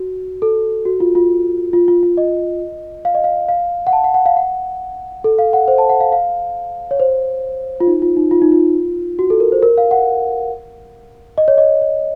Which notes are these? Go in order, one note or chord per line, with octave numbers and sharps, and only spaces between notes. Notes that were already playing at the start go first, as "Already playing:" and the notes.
Already playing: F#4
A4
F#4
F4
F4
F4
F4
F4
D#5
F5
D#5
F5
F5
F#5
A5
F#5
F#5
F5
F#5
A4
F5
F#5
C5
A5
F#5
F5
F5
C#5
C5
F4
D#4
F4
D#4
F4
D#4
F4
F#4
A4
A#4
C5
A#4
F5
F#5
D#5
C#5
D#5
C#5